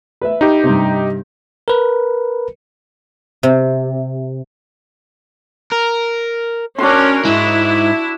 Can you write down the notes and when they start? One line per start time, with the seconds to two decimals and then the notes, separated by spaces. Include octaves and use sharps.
0.21 B4 E5
0.41 D#4 G4
0.64 G2 C3
1.68 A#4 B4
3.43 C3
5.72 A#4
6.79 C#4 D4 F#4 A#4 C6
7.25 G#2 G#3 E4